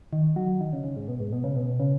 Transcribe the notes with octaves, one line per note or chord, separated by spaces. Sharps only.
D#3
F#3
D#3
C#3
C#3
G#2
B2
G#2
B2
C#3
B2
C#3